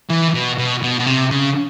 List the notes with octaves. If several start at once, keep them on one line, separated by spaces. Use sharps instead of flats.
E3
B2
B2
B2
B2
C3
C#3